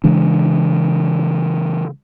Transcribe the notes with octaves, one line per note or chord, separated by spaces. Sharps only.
C#3 E3 G#3 D4